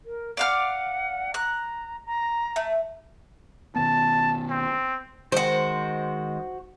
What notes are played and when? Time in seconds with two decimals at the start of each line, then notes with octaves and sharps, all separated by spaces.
0.05 A#4
0.37 D5 F5 F#5 F6
1.34 A#5 F#6
2.06 A#5
2.56 A3
3.76 B2 D#3 B3 A5
4.50 C4
5.32 D#3 G#3 F#4 C5